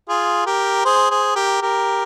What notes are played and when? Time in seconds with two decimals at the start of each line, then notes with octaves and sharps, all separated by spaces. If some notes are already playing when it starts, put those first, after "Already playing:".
0.09 F4 G#4
0.46 G4 A#4
0.85 G#4 C5
1.10 G#4 C5
1.36 G4 A#4
1.62 G4 A#4